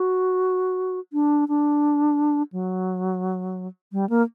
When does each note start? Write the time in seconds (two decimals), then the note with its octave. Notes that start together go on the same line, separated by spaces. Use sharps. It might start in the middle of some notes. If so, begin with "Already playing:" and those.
Already playing: F#4
1.13 D4
1.48 D4
2.52 F#3
3.92 G3
4.10 A#3